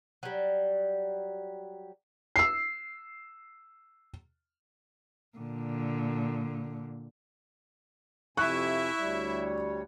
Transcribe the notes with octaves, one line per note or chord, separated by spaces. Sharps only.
F#3 G3
E6 C7
A#2 D3
F2 C3 E4 E5 G#5 C#6 F#6
D2 G3 C#5